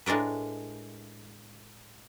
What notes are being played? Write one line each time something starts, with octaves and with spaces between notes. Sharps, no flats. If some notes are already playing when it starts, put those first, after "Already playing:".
A2 G#3 D4 A#4 B4